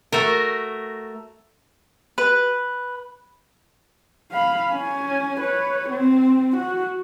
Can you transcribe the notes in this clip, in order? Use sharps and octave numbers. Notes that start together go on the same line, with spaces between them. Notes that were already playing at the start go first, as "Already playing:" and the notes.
A3 F#4 A#4
B4
F5 B5
C#4 G#5
B4 C#5
C4
F#4